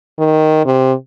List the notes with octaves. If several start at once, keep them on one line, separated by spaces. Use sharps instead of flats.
D#3
C3